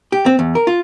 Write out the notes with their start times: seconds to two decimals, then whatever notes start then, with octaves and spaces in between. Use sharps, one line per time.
0.12 G4
0.26 C4
0.39 E2
0.55 A#4
0.67 F4